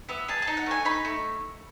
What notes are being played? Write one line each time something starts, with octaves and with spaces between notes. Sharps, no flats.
B3 E5
G#4 A5
A5
D#4
F#5
A3 G#5
D#4 B5
A3